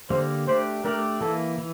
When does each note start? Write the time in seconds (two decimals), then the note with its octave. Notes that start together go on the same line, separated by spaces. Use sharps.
0.10 D3 G3 A#3 C5
0.47 A3 D4 G4 C5 D5
0.84 A3 D4 G4 A#4 D5
1.20 E3 A#3 E4 A4
1.58 E3